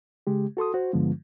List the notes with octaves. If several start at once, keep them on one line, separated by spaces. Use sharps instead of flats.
C#3 G#3 G4
F#4 A4 C6 D#6
F#4 C5
G2 D3 F3 G#3 B3 F4